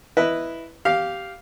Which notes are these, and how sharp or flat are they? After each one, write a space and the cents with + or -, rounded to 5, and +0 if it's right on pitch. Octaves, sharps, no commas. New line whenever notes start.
E4 +0 B4 +0 D#5 -10
G4 -10 F5 +0